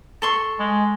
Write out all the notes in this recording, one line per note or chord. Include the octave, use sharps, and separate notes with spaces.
A4 C6 C#6
G#3